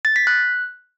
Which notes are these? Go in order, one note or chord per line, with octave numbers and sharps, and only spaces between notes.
A6
B6
F#6